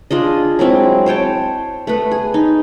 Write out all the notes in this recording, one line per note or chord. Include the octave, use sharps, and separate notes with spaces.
D4 F4 G#4 D#5
F#3 G#3 C4 E4
C5 C#5 G5 A5
A3 B3 B4
G#4
D#4